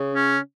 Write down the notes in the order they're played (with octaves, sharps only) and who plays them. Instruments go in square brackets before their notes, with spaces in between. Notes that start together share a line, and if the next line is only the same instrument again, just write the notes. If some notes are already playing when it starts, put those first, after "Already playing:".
Already playing: [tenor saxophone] C#3
[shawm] C#4